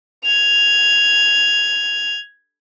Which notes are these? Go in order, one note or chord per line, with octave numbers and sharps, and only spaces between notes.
G#6 F7